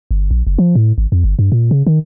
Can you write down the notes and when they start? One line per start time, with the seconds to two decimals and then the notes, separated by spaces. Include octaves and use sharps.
0.11 G1
0.31 A#1
0.47 F#1
0.58 F3
0.75 A2
0.98 G#1
1.12 F2
1.24 G1
1.39 G2
1.52 A#2
1.71 C#3
1.87 D#3